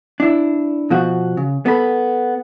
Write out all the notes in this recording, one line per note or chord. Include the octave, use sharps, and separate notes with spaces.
D4 E4
B2 F3 F#4
C#3
B3 A4 B5